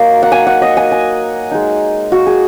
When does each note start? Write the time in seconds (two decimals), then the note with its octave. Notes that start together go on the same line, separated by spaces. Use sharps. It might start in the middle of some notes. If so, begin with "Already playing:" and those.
Already playing: F#3 A#3 D#4
0.23 F#5
0.32 G#5
0.47 F#5
0.62 D#5
0.77 G#5
0.92 G#5
1.52 G#3 D#4
2.12 F#4
2.27 G#4